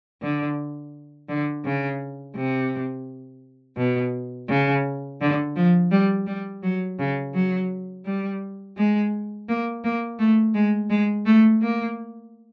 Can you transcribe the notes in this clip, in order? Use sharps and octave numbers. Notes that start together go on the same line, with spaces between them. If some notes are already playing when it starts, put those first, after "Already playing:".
D3
D3
C#3
C3
B2
C#3
D3
F3
G3
G3
F#3
C#3
F#3
G3
G#3
A#3
A#3
A3
G#3
G#3
A3
A#3